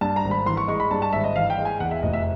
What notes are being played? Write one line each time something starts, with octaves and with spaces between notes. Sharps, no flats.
G2 A5
A#5
G#1
B5
E3 C6
C#6
G#3 C#6
B5
G2 A5
A5
G#1 E5
D#5
E3 F5
G5
G#3
G#5
E2 F#5
E5
F1 D#5
E5